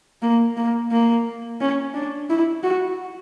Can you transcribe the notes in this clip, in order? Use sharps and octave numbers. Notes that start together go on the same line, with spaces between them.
A#3
A#3
A#3
C#4
D4
E4
F#4